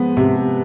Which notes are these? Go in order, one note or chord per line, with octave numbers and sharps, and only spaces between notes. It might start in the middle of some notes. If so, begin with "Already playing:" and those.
Already playing: F3 G#3 B3
C3